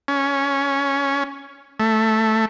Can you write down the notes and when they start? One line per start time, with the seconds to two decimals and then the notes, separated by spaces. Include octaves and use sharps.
0.08 C#4
1.80 A3